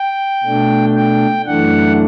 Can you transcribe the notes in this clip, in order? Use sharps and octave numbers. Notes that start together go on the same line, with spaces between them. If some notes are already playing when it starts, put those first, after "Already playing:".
Already playing: G5
B2 A3 D4
G5
F#2 E3 A3 D4 F#5